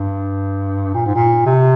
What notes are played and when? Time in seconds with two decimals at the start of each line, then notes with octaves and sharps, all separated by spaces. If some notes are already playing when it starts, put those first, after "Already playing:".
Already playing: G2
0.94 A#2
1.06 G#2
1.15 A#2
1.46 C3